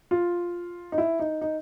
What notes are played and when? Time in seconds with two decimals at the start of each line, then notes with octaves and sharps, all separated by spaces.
0.11 F4
0.92 D#4
0.98 E4
1.19 D#4
1.41 D#4